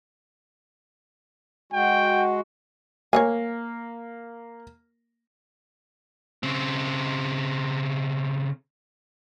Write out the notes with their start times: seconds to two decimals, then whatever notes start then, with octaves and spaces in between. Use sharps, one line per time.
1.73 G#3 F#4 G5
3.13 A#3 C#5 D#5 G#5
6.43 C#3 C4